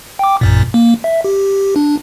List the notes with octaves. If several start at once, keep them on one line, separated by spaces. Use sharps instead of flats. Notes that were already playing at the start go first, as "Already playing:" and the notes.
G5 D6
A1 F#2 A#2
A#3
E5
G4
D4